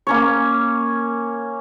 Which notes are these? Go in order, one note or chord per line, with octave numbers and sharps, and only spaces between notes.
A#3 C#4 C#5